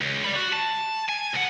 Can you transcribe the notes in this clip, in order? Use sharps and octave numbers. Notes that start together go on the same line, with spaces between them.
C#2
D5 B5
F#4
A5
G#5
C#2 F#5